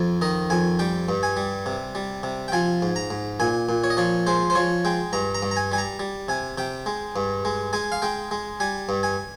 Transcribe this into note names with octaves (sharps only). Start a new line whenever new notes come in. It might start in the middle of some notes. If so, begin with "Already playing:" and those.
Already playing: F2
D#3 D#5
F2 G#5
G3 G5
G2
G#5
G3
C3
G3
C3
G5
F3 G#5
G#2
A#5
G#2
A#2 G#5
A#2
C#5
D#5
F3 C#5
G#3 C5
C5
F3 C#5
G#3 G5
G2 A#5
A#5
G2
A#5
G#5
G3 G#5
A#5
G3
C3 G#5
C3 G5
G#3
G2
G#3
G#3 G#5
F5
G#3 G5
G#3
G3 G#5
G2
G#5